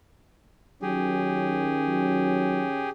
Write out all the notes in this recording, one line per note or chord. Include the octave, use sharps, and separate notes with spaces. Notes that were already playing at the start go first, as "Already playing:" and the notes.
D#3 F#3 C#4 G4 G#4
F#3